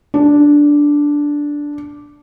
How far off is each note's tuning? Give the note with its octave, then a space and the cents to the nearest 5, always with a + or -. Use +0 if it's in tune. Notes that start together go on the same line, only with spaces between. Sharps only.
D4 -5